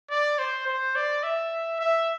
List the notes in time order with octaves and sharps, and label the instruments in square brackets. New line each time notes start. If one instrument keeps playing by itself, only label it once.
[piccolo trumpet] D5
C5
C5
D5
E5
E5